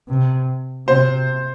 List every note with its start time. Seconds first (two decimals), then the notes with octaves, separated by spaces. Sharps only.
0.09 C3
0.87 C3 C5